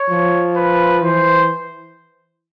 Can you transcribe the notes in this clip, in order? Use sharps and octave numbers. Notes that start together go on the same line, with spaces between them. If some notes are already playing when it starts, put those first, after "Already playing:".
Already playing: C#5
F3
B4
E3 C5